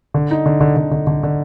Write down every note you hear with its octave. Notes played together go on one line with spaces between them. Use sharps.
D3
D#4
D3
D3
D3
D3
D3
D3